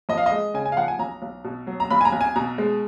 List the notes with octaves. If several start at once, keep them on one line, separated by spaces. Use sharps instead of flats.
F2 D#5
F5
D#5
G#3
C#3 G#5
G#5
F5
F3 F#5
G#5
B1 A#5
B1
B2
F#3
A#5
B1 B5
G#5
A#5
B1
G#5
B2 A#5
G#3